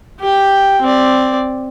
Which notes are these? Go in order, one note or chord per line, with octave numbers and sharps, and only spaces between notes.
G4 G5
C4 D5